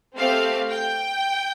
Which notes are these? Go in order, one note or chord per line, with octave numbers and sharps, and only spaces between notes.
A3 C4 G4 F5
G5